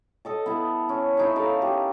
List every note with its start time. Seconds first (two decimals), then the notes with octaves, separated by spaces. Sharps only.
0.25 A4 D#5 A5
0.46 B3 E4
0.89 C#4
1.17 C#4 D#4 E4
1.36 D#4 A4 A#4 F5
1.62 G4